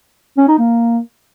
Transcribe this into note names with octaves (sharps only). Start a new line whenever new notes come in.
C#4
D#4
A#3